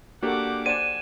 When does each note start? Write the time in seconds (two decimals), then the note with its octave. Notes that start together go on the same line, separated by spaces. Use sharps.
0.23 A#3 D4 F#4 G4 A4 A#4 F#5 D6
0.66 C5 D5 F#5 G#5 D#7 E7